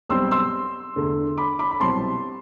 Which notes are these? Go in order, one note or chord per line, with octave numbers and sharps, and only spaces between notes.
B1 B2 G3 C4 C6 E6
C6 E6
E2 D3 A3 D4
B5 D6
B5 D6
B5
C2 B2 F#3 C4 A5 C6